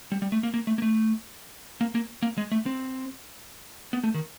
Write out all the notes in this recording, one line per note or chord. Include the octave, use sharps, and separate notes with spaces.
G3
G3
A3
A#3
A#3
A3
A#3
A3
A#3
A#3
A#3
G#3
A3
C4
B3
A3
D#3